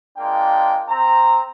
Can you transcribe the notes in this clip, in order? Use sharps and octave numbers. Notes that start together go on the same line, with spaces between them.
G#3 A#3 D4 F4 G5
C4 A#5